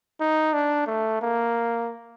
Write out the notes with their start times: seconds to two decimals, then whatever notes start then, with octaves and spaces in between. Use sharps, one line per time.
0.20 D#4
0.54 D4
0.87 A3
1.22 A#3